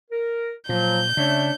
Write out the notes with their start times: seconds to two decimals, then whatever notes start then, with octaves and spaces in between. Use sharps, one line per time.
0.10 A#4
0.69 A#2 F3 F#3 G6
1.17 C#3 A3 D4 C#5 E5